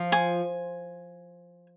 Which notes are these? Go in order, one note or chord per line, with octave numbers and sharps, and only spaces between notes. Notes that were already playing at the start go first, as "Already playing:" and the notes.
Already playing: F3
G#5